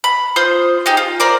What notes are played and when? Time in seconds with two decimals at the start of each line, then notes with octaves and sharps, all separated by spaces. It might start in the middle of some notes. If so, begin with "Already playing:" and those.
0.04 B5
0.36 F4 C5 C6 D#6
0.86 D#4 G4 G#4
0.97 F4
1.20 A#4 C5 D5